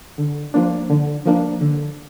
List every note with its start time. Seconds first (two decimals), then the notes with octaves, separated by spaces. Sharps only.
0.18 D3
0.54 F3 A#3 D4
0.90 D3
1.25 F3 A#3 D4
1.61 D3